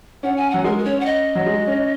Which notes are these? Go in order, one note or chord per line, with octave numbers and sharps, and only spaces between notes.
C#4 F#5
G#5
F#3 F#5
G#3 A#4
A#4
C#4 C#5
F#5
D#5
F#3
G#3
C#4